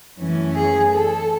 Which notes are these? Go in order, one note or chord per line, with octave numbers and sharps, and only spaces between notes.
F#2 E3 A3 C#4
G#4
A4